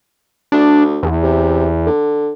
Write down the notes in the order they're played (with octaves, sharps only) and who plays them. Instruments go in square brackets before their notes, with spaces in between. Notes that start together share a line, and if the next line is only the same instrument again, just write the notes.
[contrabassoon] D2 [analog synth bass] D4
[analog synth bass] E2
[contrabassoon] C3
D3